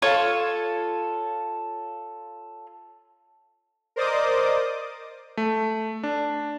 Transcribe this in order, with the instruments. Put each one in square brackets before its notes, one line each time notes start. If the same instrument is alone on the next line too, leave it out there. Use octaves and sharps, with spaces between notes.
[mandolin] F4 A4 C#5
[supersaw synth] A#4 C5 D5 D#5 D6 D#6
[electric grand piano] A3
D4